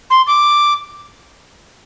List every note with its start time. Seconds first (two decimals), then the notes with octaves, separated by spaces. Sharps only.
0.10 C6
0.27 D6